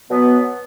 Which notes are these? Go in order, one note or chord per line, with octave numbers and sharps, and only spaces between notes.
B2 F#3 B3